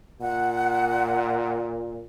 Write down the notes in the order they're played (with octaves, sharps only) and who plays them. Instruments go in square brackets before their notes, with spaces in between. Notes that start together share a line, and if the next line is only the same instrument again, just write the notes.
[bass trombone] A#2 [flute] F#5